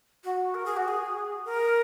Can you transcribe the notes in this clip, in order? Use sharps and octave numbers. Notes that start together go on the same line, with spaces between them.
F#4
A#4
G#4
F#4
G#4
A#4